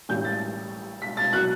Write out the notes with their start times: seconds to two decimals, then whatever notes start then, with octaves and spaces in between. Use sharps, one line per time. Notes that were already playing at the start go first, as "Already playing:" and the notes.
0.09 A1 A2 G3 D4 G6
0.25 A6
1.02 B6
1.17 A6
1.33 B2 F#3 F#6